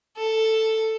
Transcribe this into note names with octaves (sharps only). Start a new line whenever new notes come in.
A4